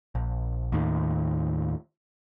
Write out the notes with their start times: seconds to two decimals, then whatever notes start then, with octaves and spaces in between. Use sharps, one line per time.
0.15 A#1
0.72 D#2 A2 D#3